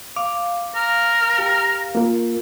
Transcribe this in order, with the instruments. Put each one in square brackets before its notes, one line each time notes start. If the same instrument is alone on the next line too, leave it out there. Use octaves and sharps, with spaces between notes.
[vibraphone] F5 [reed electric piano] D6
[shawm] A#4
[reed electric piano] G4
A#3 F4 A#4